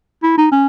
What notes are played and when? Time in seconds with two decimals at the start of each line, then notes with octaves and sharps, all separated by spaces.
0.23 E4
0.37 D#4
0.52 C#4